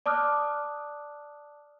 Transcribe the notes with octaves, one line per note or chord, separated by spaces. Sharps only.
D5 A5 D6 D#6 F6 F#6